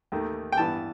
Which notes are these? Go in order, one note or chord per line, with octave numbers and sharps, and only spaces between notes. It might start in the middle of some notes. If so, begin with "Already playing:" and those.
D#2 D#3 A3
G5
G2 E3 B3 A5